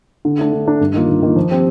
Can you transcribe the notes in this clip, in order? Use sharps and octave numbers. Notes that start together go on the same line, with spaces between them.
D3
A3 D4
D3
A3 D4
G2
D#3 A#3 F4
G2
D#3 A#3 F4
F3
C4 G4